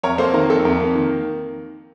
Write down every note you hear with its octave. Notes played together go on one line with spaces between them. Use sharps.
F2 A#4 C#5
A#3 A4 C5
D#3 A#4
F2 A4
F2 A#4
A#3
D#3